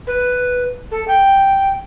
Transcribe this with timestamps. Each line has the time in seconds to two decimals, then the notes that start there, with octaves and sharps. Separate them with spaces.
0.07 B4
0.91 A4
1.08 G5